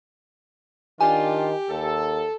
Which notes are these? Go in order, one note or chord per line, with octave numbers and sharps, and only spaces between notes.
D#3 D4 F4 G4 G#5
D#2 A4